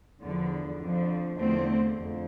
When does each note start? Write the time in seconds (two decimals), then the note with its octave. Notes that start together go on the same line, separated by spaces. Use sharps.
0.21 E2 D3 F3
0.80 F2 D3 F3
1.38 E2 D3 F3 A3 C4
1.97 F2